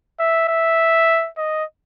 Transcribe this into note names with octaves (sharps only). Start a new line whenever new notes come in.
E5
E5
D#5